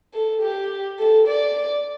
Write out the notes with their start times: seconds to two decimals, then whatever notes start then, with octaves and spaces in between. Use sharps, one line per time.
0.14 A4
0.42 G4
0.99 A4
1.28 D5